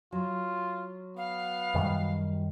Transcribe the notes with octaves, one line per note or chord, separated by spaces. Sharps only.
F#3 F4
B3 F5
F#2 D#3 G3